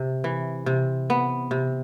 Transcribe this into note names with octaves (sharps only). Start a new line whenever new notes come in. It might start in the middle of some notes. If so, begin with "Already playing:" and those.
Already playing: C3
E3
C3
B3
C3